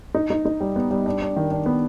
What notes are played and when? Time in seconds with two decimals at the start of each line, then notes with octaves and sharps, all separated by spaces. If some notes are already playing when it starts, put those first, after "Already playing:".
0.15 D#4
0.30 D#4
0.45 D#4
0.60 G3
0.76 B3
0.91 G3
1.06 D4
1.21 D4
1.36 D#3
1.51 D4
1.66 B3